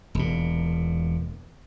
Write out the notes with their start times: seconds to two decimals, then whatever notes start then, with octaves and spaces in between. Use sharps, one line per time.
0.15 E1 A#2